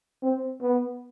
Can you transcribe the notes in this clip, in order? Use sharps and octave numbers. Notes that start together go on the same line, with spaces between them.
C4
B3